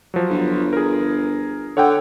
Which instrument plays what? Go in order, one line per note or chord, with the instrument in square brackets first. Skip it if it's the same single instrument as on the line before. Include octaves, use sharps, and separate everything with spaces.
[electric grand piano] F3 F#3
[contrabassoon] G1
[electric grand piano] G#4 A#4
[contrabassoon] D3 [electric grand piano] C#5 F#5 G5